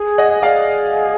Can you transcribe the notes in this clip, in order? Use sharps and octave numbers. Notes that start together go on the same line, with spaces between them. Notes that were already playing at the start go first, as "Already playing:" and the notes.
Already playing: G#4
D#5 F#5
G#4 D5 F5